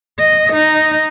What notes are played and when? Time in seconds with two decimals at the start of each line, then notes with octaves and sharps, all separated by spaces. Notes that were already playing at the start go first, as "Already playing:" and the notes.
0.19 D#5
0.53 D#4